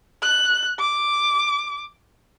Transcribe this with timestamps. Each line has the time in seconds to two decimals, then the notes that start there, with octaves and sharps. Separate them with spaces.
0.22 F#6
0.79 D6